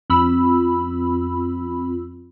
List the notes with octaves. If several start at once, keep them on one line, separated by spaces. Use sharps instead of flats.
F2 B5 E6